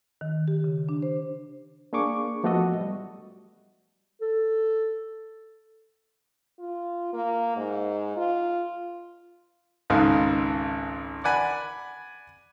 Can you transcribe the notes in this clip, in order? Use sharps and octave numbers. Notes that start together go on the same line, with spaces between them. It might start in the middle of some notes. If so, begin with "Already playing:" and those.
D#3
G4
C#3
D4
C5
A#3 D4 G#4 C#6 D6
F3 A3 B3 F#4 A4 D#5
G3
A4
F4
A#3
G#2
F4
G#1 C#2 D#4 A4 F5
D5 F#5 G#5 B5